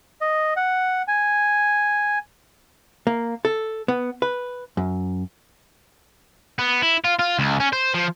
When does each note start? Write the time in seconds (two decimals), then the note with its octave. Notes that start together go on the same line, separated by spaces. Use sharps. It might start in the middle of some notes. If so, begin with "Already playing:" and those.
0.21 D#5
0.56 F#5
1.08 G#5
3.07 A#3
3.45 A4
3.88 B3
4.22 B4
4.77 F#2
6.59 B3
6.83 E4
7.05 F4
7.19 F4
7.39 C#2
7.60 C#4
7.73 C5
7.94 F3